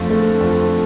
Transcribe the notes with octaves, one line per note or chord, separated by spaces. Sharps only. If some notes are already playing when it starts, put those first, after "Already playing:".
Already playing: F2 D3 F3 A3
A3
F2